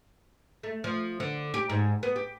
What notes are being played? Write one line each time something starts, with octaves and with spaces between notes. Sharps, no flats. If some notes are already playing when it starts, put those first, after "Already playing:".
A3
F3
D3
G4
G#2
B3
G4